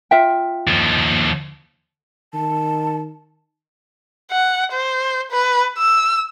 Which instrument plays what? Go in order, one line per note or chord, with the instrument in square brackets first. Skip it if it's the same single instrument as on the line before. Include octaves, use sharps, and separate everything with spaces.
[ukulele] F4 E5 G5
[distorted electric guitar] D#2 F3
[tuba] D#3 [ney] A5
[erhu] F#5
C5
B4
E6